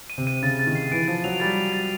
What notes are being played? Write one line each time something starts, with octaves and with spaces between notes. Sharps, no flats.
D#7
C3
D#7
C#3 A6
A6
D#3
C7
E3 D7
F3 A6
F#3 F7
G3 A6
F7
A6